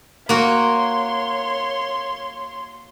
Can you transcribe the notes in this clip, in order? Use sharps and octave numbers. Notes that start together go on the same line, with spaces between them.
A#3 F#4 C#5 C6